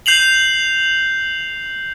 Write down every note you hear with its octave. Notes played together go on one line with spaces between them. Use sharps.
G6 C7 F7 F#7